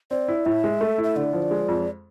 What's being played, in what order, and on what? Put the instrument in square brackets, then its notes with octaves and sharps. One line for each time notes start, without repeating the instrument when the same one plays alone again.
[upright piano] C4 [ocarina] D5
[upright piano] E4
[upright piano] A2 [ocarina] E5
[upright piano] G#3
A3
E4
[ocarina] E5
[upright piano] D3 [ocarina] D5
[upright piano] F3
G#3
F2